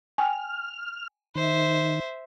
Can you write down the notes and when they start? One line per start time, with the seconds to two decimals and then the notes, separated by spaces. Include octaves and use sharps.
0.18 G5 G#5 F6
1.35 D#3 C5 E5